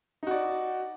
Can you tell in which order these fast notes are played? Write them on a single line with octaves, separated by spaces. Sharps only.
D#4 F#4 D5